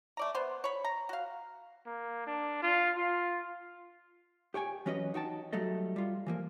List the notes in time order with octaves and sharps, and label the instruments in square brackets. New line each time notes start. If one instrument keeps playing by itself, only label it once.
[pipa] A3 D5 A#5
B3 C5
C#5 B5
A#5
F#4 F5
[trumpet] A#3
D4
F4
F4
[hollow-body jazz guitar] G4 C#5 G5 G#5
E3 F#3 C#4 F#4 B4 D#5
D#4 F#4 G5 A5
F#3 G3 A3 A4 D#5
G3 F4
E3 F3 A#3